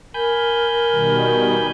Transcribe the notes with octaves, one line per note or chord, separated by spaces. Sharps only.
A#4 G#5 B5 G6
B2 D#3 G3